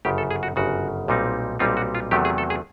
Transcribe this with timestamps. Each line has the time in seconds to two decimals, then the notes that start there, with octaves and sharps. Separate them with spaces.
0.05 G1 F#2 C#3 G4
0.18 A4
0.31 G#4
0.43 F#4
0.56 G1 F#2 C#3 F#4
1.08 B1 A#2 G3 C4 D#4
1.59 B1 A#2 G3 C4 D#4 F4
1.77 F#4
1.95 F4
2.11 E2 C3 D#3 F#3 A3 G4
2.25 G#4
2.38 A4
2.50 G#4